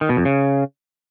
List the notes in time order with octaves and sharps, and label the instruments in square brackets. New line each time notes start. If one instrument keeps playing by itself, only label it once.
[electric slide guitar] D#3
B2
F2
C#3